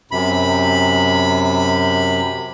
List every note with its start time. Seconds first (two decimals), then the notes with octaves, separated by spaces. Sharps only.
0.11 F#2 C3 B5